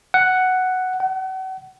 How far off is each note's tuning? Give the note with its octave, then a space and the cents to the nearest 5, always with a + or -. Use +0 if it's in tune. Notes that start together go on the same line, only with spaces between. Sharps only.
F#5 +5
F#5 +40